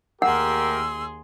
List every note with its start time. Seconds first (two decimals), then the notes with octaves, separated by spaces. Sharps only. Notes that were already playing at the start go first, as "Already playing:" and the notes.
0.22 D#2 A3 G4 G#4 A#4 F#5 C6 E6